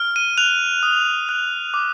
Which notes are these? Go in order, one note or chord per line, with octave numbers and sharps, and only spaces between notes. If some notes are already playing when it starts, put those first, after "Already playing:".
Already playing: F6
D#7
F#6 F7
D#6
F#6
D6